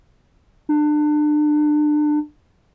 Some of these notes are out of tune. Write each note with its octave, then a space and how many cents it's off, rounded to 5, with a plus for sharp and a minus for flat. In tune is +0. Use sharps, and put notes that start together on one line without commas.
D4 +30